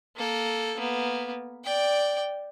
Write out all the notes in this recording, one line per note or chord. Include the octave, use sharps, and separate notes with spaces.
A#3 A4
A#3 B3
D5 G5